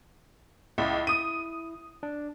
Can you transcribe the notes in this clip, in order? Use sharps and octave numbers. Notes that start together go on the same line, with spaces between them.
C#2 E4
D#6 D#7
D4